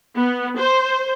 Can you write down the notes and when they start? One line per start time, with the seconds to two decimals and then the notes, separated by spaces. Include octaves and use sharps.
0.15 B3
0.58 C5